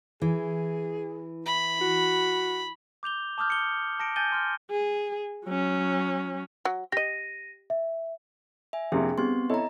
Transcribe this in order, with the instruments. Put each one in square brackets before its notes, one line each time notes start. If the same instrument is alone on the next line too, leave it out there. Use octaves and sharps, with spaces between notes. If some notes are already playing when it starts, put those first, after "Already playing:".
[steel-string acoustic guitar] E3 [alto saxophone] G#4
[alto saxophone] E4 [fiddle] B5
[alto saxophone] F#4
[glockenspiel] D6 G6 F7 G7
A5 D6 D#6 F6 G6
C#7 G7
A5 A#6 C#7 D7
G#5 G6 A6 D#7 G7
C6 F6
[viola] G#4
F#3 C#4
[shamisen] F#3
[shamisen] G4 D#5 [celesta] A#6 D#7
[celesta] E5
[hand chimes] E5 G#5
[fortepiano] F2 C3 A#3 [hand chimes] D4 G#4
[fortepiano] G3 [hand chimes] B3 C4 C6
[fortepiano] E4 A4 C#5 [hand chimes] D#5 A#5